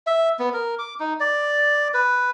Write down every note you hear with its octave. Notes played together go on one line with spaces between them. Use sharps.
E5
B3
A#4
D6
D#4
D5
B4